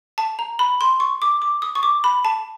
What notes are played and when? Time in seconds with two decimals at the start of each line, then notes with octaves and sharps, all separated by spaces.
0.18 A5
0.39 A#5
0.59 B5
0.81 C6
1.00 C#6
1.22 D6
1.42 D6
1.62 D#6
1.75 C#6
1.83 D6
2.04 B5
2.25 A5